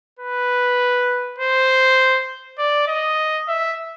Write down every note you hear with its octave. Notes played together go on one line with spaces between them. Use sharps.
B4
C5
D5
D#5
E5